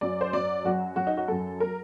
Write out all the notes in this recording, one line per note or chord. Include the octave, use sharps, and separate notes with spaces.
F#2 F#3 D5
C5
F#2 F#3 D5
F#2 F#3 F#4
F#2 F#3 F#4
D#4
F#4
F#2 F#3 A4
F#3 A#4